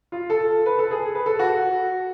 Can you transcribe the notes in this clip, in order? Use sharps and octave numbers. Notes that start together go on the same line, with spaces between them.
F4
A4
B4
A4
G#4
B4
A4
F#4